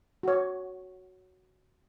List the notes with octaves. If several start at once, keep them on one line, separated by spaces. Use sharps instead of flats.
F#4 C#5